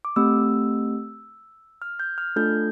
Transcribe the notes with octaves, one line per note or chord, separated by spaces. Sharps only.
D6
A3 C4 G4 E6
F6
G6
F6
A3 D4 F4 A4 G6